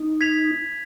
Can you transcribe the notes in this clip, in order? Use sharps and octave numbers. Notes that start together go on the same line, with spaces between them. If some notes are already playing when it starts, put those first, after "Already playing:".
Already playing: D#4
G#6 B6 F7